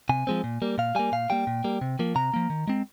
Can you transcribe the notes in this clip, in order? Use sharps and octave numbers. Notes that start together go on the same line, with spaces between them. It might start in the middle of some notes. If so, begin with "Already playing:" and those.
C3 G#5
F3 G#3 C4
A#2
G3 A#3
A#2 F5
G3 A#3 G#5
A#2 F5
G3 A#3 G5
A#2
G3 A#3
C3
F3 A#3
C3 A#5
F3 A#3
D#3
G#3 C4